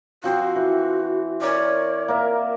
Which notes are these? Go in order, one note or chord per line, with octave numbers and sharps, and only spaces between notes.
F3 C4 F#4 C6
E3
A#4 C#5 D5
A#3 A#4 E5